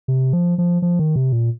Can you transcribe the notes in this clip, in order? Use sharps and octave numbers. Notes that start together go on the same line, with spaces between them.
C3
F3
F3
F3
D#3
C3
A#2